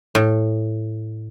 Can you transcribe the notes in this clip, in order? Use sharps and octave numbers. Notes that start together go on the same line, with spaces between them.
A2